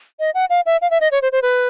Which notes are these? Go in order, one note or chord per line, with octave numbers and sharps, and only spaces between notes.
D#5
F#5
F5
E5
F5
E5
D#5
C#5
C5
C5
B4